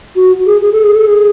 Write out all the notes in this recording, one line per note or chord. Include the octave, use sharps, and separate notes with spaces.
F#4
G#4
G#4
A4
G#4
A4
G#4